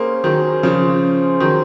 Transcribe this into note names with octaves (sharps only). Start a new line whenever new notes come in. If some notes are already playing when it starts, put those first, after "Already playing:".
Already playing: A#3 C#4 G#4 C5
D#3 F#3
C#3 F3
D#3 F#3